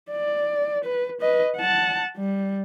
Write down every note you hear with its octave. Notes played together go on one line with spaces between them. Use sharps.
D5
B4
B4 D#5
F#5 A5
G3